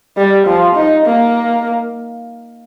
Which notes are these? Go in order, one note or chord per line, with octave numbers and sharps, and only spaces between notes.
G3
F3
D#4
A#3